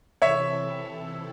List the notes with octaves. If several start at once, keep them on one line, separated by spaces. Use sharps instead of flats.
C3 E3 C4 E4 A4 C#5 E5